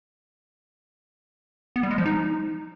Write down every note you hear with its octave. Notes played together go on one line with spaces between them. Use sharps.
B3
G3
G#3
F3
D#4